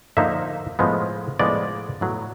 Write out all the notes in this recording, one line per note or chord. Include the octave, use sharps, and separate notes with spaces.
D3 F3 A#3 D#4 E5
A2 F3 G#3 B3
A2 F3 G#3 B3 D5
A2 F#3 B3